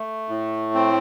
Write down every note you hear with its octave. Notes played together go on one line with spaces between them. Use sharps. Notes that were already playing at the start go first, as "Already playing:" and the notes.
Already playing: A3
A2
C4